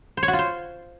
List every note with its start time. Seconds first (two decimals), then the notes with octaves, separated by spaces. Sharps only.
0.17 C5
0.23 C#5
0.28 F#4
0.33 F4
0.39 C5